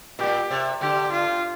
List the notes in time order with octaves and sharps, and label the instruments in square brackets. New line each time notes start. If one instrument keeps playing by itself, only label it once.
[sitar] A#2 [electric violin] G4
[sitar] C3
[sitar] D3 [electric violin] G4
[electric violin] F4